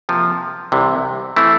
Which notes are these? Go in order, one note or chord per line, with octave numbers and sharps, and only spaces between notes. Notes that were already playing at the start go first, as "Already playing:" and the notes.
C3 F3 A#3
C2 C3 E3
E3 A3 C4 E4